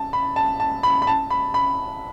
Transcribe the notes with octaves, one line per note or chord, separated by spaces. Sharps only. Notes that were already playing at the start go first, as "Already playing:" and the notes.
Already playing: A5
B5
A5
A5
B5
B5
A5
B5
B5